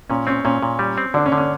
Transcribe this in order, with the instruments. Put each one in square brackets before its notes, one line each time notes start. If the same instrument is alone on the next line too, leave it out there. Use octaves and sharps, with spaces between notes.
[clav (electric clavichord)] A#2 [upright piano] C#4
[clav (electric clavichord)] C4 [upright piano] C#4
[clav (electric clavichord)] A#2 [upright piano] C#4
[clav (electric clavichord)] A#2
G3
C4
[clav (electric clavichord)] D3 [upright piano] D4
[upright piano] C#4
[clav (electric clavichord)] D3
[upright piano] C#4